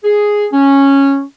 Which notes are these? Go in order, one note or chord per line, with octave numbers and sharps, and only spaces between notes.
G#4
C#4